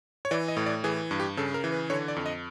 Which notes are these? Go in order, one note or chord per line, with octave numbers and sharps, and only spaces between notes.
C#5
E3 D5
D#5
A2
D5
E3 G#4
G2
G4
C#3 A4
A#4
E3
B4
D3 C#5
D5
F2
D#5